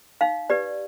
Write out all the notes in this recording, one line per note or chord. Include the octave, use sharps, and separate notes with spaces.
D#4 F5
G4 B4 D5